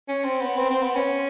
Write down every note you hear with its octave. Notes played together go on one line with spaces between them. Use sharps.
C#4
C4
B3
C4
C4
B3
C#4